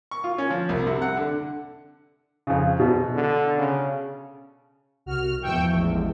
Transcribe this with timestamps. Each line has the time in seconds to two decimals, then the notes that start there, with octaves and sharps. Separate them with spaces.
0.11 C#6
0.24 F4
0.38 C#4
0.50 F3
0.69 C2
0.86 C3
1.02 F#5
1.17 D3
2.47 F2 C#3
2.80 E2 B2
3.14 D3
3.58 C#3
5.06 C2 F#4 F6
5.42 E2 E3 F3 G5 C#6 E6
5.73 A1 G#3